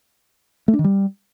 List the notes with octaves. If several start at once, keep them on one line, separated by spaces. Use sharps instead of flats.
A3
D4
D#3
G3